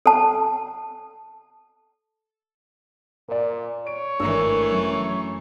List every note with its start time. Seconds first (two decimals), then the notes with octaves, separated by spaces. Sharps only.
0.06 A4 A5
3.29 A#2 A#4 D5
3.87 C#5 D7
4.20 G#1 E3 A3 D4 A#4 E6
4.72 F#2